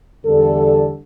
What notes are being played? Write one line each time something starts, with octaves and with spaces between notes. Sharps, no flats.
E2 D3 G3 A4